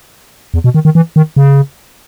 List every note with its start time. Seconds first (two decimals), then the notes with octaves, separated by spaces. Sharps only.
0.54 E2
0.64 B2
0.74 D#3
0.85 D#3
0.95 E3
1.16 D#3
1.36 C#3